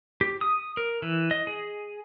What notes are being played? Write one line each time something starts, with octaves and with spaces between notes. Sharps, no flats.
G4
D#6
A#4
E3
D#5
G#4